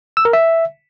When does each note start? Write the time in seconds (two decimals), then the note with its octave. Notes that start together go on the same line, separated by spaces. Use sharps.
0.17 E6
0.25 A#4
0.33 E5